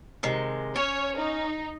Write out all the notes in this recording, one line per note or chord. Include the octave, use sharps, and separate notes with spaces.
C3 D#3 G#3
C#4 C#5
D#4